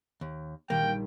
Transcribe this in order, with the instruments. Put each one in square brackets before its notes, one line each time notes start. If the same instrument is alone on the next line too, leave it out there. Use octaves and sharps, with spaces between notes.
[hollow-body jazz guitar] D#2
[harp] A#1 D#3 G3 [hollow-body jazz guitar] A#3 [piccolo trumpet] G5